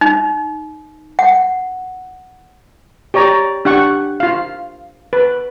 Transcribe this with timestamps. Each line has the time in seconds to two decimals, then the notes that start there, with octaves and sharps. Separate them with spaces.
0.01 D#4
1.19 F#5
3.14 G4 C#5 D5 A#5
3.65 D4 G4 F#5 C#6
4.20 F4 F5
5.13 B4